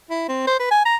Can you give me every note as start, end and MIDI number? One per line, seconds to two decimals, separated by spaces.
0.10 0.25 64
0.29 0.43 60
0.48 0.59 72
0.60 0.68 71
0.71 0.81 80
0.86 0.96 82